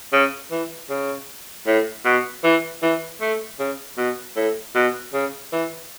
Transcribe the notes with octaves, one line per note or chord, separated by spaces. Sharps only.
C#3
E3
C#3
A2
B2
E3
E3
A3
C#3
B2
A2
B2
C#3
E3